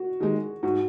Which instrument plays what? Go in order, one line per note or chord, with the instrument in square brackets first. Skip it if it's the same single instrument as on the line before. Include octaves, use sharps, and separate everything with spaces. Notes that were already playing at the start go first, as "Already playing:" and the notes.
Already playing: [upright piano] F#4
[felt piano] D#3 G#3 [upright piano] G#4
[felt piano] G#2 [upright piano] F#4